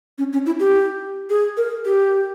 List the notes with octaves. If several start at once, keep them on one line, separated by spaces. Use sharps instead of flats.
C#4
C#4
E4
G4
G#4
A#4
G4